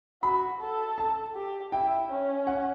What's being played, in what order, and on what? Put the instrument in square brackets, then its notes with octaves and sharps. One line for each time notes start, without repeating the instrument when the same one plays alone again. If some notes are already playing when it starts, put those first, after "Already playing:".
[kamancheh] F#4 [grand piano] B5
[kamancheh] A4
[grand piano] A5
[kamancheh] G4
[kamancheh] E4 [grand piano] G5
[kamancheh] C#4
[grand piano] F#5